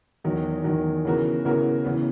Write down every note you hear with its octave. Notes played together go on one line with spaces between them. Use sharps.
E2 D#3 F#3
E2 D#3 F#3
C#3 E3 B3 F#4 A#4
C#3 E3 B3 F#4 A#4
C#3 E3 B3